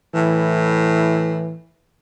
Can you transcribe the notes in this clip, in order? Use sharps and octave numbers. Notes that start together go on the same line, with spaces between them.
A2 E3